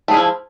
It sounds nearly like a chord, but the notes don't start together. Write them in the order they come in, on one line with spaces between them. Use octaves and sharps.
A3 G#4 E4 F3